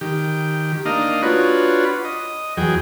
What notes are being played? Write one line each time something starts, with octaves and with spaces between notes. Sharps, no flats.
D#3 G4
A#3 D4 D#4 D#5 F5
D4 F4 F#4 B4 C#5
D#5
E2 F#3 G#4 G5